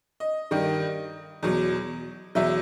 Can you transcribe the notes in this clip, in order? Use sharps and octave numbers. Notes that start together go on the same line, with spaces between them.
D#5
G2 D#3 G3
E2 B2 F#3
E2 B2 F#3 E5